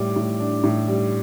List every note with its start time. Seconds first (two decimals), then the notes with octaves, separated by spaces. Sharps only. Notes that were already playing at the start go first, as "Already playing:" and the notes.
Already playing: A2 G3 D6
0.16 A2
0.40 D4
0.64 A2
0.88 G3